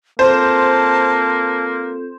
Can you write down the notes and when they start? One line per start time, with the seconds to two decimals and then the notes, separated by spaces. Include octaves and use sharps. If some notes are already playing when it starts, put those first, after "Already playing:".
0.19 A#3 C4 F4 A4 C5 A5